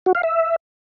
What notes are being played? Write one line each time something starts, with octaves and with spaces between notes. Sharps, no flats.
F#4
F5
E5